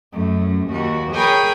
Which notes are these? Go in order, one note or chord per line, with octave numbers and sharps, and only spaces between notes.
F#2 A3
D#2 F#4
G#4 A#4 C#5 G5 G#5 B5